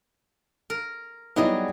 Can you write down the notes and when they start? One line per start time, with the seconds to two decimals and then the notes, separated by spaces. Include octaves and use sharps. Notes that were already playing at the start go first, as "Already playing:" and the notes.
0.70 A#4
1.36 F#3 G3 B3 D#4 E4 G#4